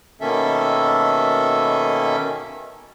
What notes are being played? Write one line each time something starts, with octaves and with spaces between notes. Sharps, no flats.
B2 D#3 A#3 C#4 A4 E5